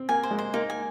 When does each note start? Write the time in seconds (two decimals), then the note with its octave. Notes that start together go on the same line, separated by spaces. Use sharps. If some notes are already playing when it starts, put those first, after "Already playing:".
Already playing: C4
0.09 A#3 G#5
0.23 C5
0.31 G#3
0.39 C5
0.54 A#3 D#4
0.70 G#5